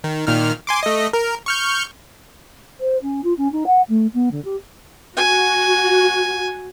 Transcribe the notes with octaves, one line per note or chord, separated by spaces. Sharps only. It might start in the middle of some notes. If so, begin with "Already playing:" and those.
D#3
A#2 D#3 F6
G#5 C6 D6
A3 D#5
A#4
C#6 F6 G6
C5
C#4
F4
C#4
D#4
F#5
A3
B3
D3
G4
F#4 G#5